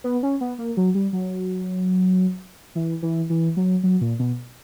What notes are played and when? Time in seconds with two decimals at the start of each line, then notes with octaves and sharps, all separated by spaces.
0.04 B3
0.23 C#4
0.41 B3
0.58 A#3
0.77 F#3
0.95 G3
1.13 F#3
2.75 E3
3.02 E3
3.30 E3
3.57 F#3
3.83 F#3
4.01 A#2
4.19 B2